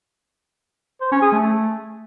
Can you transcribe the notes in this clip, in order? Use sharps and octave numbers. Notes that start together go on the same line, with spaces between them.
C5
C#4
G#4
A3